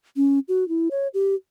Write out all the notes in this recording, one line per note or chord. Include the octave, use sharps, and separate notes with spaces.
C#4
F#4
E4
C#5
G4